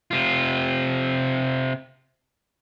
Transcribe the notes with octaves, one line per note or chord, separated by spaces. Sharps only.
C3 F4